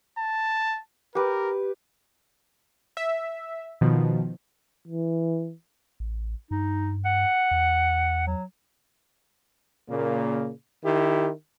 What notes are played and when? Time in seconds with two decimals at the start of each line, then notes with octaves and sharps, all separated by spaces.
0.19 A5
1.15 G4 A#4 B4
2.97 E5
3.81 B2 D#3 F3
4.88 E3
6.00 A1
6.51 G2 D#4
7.05 F#5
7.51 E2
8.27 F#3
9.90 A#2 C#3 A#3
10.84 D#3 E4 G4